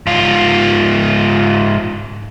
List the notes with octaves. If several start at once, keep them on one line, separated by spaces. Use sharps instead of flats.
G#2 F4